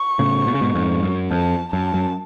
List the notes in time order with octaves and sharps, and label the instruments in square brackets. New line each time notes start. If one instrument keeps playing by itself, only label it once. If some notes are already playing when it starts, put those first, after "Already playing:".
Already playing: [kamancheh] C#6
[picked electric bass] A2 C#3
B2
C#3
G#2 B2
F2 G#2
F#2
[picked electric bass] F2 [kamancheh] A5
[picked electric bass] F#2 [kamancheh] A5
[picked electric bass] F#2